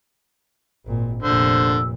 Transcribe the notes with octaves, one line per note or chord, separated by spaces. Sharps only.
G#1 A#2
F1 A#2 D3 C5 E6